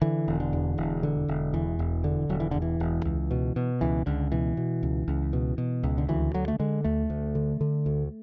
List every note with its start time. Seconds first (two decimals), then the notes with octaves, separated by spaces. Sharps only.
0.01 D3 E3
0.28 E1
0.40 D3
0.53 E2
0.78 E1
1.03 D3
1.28 E1
1.54 E2 E3
1.79 E1
2.04 D3
2.29 E1 F#3
2.40 E3
2.51 E2 D3
2.62 E3
2.80 E1
3.05 C#2
3.31 B2
3.56 B2
3.81 C#2 E3
4.06 C#2 D3
4.32 B2 E3
4.57 B2
4.83 C#2
5.08 C#2
5.33 B2
5.58 B2
5.83 C#2
5.98 D3
6.09 D2 E3
6.34 D3 F#3
6.48 A3
6.60 D3 G#3
6.84 D2 A3
7.10 D2
7.35 D3
7.61 D3
7.86 D2